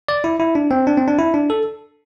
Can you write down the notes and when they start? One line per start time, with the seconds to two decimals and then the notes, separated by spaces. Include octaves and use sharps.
0.08 D5
0.24 E4
0.39 E4
0.55 D4
0.71 C4
0.87 D4
0.97 C4
1.08 D4
1.18 E4
1.34 D4
1.50 A4